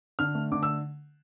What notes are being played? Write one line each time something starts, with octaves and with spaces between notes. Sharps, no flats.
D3 F6
A3
D3 D6
E6